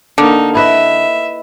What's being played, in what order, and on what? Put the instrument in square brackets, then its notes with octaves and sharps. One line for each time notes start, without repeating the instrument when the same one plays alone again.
[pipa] D3 [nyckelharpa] A#3 D#4
[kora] E4 B4 D#5 [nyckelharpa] E5